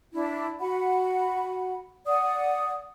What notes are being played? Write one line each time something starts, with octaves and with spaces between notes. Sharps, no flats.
D4 E4
F#4 F#5 B5
D5 F#5 D#6